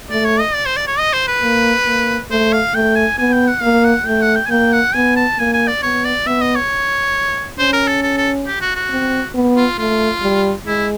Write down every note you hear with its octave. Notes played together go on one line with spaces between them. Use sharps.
A3 D5
C#5
D#5
D5
C5
D5
C#5
D#5
C5
B4
A#3
A#3
A3 C5
F5
A3 G5
G#5
B3 G#5
G5
F#5
A#3 F5
F#5
A3 G5
F#5
G5
G#5
A#3 G5
F#5
B3 G#5
A5
A#3 G#5
G#5
D5
B3 C#5
D5
B3 E5
D#5
C#5
C#4 C5
A#4
A4
A4
A4
G4
F#4
F#4
C4
B3
F4
A3 F4
G3
G#3 E4